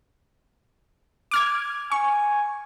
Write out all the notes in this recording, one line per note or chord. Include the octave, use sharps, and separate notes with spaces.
D6 F6 G#6
G#5 C#6